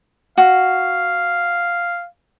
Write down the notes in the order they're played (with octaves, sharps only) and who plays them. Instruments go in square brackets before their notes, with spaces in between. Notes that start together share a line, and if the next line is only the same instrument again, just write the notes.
[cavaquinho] F#4 [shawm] F5